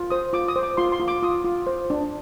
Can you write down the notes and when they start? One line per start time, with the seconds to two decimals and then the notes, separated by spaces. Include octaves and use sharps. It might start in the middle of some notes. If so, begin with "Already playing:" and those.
Already playing: F4
0.10 C5 D#6
0.33 F4 D6
0.48 D#6
0.56 C5
0.63 D6
0.77 F4 C6
0.92 C6
1.00 F4
1.08 D6
1.22 F4 D#6
1.45 F4
1.67 C5
1.90 D4